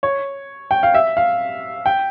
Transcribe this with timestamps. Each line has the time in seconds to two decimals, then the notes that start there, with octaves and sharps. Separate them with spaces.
0.03 C#5
0.71 G5
0.83 F5
0.94 E5
1.17 F5
1.86 G5